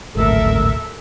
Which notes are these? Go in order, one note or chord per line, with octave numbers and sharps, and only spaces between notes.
G#1 D2 A2 A4 A#4 E5